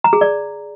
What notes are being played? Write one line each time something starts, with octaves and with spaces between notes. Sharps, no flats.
A#5
G#4
D5